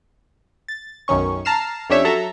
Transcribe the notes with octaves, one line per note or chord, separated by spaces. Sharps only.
A6
B1 F#2 D#3 C#4 C#6
A5 A#5 F6 C7 E7
F2 C#4 D4 G4 C#5 E5
F#3 A4 E5 A#5